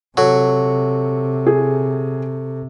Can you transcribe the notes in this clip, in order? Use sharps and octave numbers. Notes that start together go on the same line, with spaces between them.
C3 F#3 A4 C#6
G#4